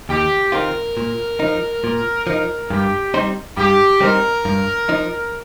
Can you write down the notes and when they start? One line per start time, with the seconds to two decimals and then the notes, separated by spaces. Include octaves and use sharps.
0.09 D#2 G4
0.52 D#3 C4 F4 A#4
0.97 A#2
1.40 F3 D#4
1.84 A#2
2.27 F3 D#4
2.70 G2 G4
3.14 G3 C4 D#4 C5
3.57 G2 G4
4.01 G3 C4 D#4 A#4 C5
4.45 G2
4.89 F3 D#4